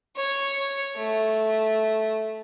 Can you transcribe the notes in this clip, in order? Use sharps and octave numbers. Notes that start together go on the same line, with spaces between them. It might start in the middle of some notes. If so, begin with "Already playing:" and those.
C#5
A3